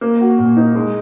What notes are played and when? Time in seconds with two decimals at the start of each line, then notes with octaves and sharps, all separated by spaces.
0.01 A#3
0.21 F#4
0.38 A#2
0.57 D#4
0.75 G#3